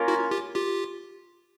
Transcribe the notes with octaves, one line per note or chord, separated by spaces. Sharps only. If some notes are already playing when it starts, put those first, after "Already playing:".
Already playing: A#3 C#4 F4 A#4
E4 F#4
F4 G4
F4 G4